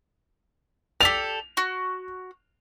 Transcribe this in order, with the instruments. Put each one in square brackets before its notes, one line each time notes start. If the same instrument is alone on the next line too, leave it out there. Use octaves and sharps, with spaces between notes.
[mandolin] G4 A4 D5 [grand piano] F7
[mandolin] F#4